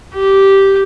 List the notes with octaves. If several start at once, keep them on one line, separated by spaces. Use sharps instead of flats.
G4